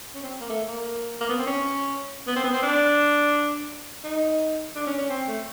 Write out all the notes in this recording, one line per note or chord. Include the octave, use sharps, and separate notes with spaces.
C#4
C4
A#3
A3
A#3
A#3
B3
C4
C#4
B3
C4
B3
C4
D4
D#4
D4
C#4
C#4
C4
A3